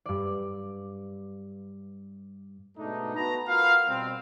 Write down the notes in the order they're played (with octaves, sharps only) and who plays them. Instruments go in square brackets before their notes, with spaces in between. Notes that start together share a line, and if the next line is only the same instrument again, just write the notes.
[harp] G2 D5
[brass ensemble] G#2 B2 A3 D4 D#4
B3 F#4 B4 A5 A#5
F4 F#4 A#4 B4 F5
B2 G3 C4